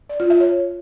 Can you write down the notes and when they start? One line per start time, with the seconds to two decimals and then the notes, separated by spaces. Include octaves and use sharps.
0.09 D5
0.20 F4
0.30 E5
0.40 C#5